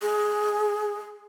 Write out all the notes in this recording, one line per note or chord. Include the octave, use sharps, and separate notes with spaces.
G#4